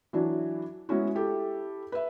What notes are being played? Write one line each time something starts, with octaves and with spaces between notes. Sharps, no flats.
E3 F#3 D4 E4
G#3 B3 C#4 E4 F#4
E4 G4 A4
B4 E5